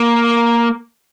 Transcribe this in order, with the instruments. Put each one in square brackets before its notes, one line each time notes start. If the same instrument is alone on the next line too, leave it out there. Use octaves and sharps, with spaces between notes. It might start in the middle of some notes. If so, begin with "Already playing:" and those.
Already playing: [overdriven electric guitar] A#3